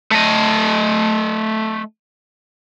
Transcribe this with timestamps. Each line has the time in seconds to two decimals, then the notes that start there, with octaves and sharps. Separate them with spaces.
0.11 A3 D#5